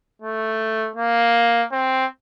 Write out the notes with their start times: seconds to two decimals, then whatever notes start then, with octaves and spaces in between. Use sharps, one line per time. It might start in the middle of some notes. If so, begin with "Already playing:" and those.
0.22 A3
0.96 A#3
1.72 C4